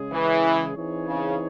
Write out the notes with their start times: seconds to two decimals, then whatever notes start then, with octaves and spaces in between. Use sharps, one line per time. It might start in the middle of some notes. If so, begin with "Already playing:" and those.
Already playing: C#3 G#3 C#4 G#4
0.12 E3
0.75 E3 C4 D#4 G#4 C#5
1.07 C#3